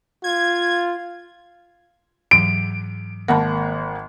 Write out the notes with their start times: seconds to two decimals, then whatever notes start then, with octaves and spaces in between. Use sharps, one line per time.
0.24 F4 G#6
2.31 G#2 E3 F#3 D7
3.28 G#1 A#3 A#4 F#5 A5 B5